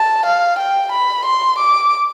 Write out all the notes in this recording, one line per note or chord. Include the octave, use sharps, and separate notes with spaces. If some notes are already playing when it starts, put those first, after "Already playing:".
Already playing: A5
F5
G5
B5
C6
D6